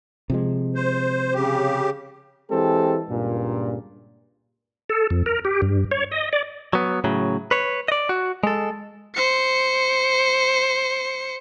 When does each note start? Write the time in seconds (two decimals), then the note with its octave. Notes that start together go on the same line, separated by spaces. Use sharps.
0.30 C3 F3 G#3
0.75 C5
1.34 C#3 G4
2.51 E3 G#3 C4 G4 A4
3.10 C#2 G2 A#2
4.89 A4
5.10 F2
5.26 A#4
5.45 G4
5.62 G2
5.91 C#5
6.11 D#5
6.33 D5
6.73 F#3 B3
7.04 A2 C#3 F#3
7.51 B4 C#5
7.88 D5 D#5
8.09 F#4
8.43 G#3 A4
9.15 C5 C#7